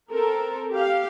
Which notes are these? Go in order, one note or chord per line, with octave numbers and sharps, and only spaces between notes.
C4 A4 A#4
G4 F5